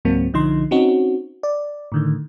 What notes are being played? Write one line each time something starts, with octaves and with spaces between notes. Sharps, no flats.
C#2 G#2 F#3 A#3 C4
B1 D3 F3 D#4 C6
C4 C#4 D#4 F#4
D5
A2 D3 D#3